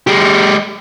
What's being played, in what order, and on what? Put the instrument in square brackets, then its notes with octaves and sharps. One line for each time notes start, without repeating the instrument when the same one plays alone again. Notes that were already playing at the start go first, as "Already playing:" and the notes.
[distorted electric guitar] G#3 G4